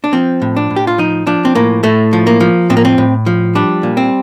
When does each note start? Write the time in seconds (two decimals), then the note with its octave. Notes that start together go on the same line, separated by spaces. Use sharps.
0.04 D4
0.13 F3 C4
0.42 A2
0.57 D4
0.70 A2
0.76 G4
0.87 F4
0.98 F3 D#4
1.27 F3 D4
1.45 C4
1.55 A2 A#3
1.83 A2 A3
2.13 F3
2.27 A#3
2.40 F3
2.70 A2 C4
2.77 A#3
2.85 C4
2.98 A2
3.26 F3
3.55 G3 D4
3.83 A#2
3.97 C4